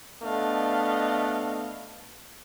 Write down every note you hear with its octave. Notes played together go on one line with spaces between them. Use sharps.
A3 B3 D4 D#5 F5